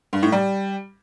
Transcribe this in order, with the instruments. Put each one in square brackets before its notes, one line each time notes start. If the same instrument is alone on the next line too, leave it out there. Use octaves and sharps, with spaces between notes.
[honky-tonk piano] G2
A2
G3